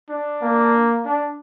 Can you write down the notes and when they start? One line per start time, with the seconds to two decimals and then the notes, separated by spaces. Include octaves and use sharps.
0.10 D4
0.42 A#3
1.05 D4